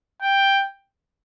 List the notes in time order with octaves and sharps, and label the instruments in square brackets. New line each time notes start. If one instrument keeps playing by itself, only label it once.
[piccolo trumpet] G5